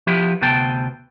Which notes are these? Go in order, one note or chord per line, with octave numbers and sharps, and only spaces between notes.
F3 B3 E4 G4
D2 C3 B3 C5 G5 A5